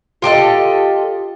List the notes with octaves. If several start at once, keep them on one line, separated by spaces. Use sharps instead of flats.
F4 G4 A4 D#5